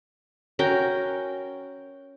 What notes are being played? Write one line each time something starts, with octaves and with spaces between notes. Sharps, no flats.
C#4 F#4 A#4 G5